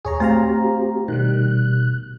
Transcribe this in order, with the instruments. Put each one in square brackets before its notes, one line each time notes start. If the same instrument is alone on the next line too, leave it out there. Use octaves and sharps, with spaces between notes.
[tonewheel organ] D#2 A2 [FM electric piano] G#4 C#5 A#5
[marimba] A3 [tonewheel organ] C4 F#4 G4 [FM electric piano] C5 F5 A#5
[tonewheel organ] B2 F#6 [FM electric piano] D#3 G3